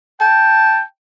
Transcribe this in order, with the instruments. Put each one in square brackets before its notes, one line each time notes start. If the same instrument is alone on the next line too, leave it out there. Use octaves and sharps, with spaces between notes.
[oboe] G5 [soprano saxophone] A5